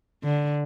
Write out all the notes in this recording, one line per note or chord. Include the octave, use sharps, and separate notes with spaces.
D3